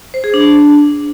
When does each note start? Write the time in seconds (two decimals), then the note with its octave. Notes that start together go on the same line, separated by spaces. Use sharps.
0.14 C5
0.24 G#4
0.34 D4